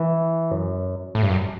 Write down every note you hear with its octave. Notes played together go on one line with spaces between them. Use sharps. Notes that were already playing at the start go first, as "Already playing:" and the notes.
Already playing: E3
F#2
A2
G2
F#2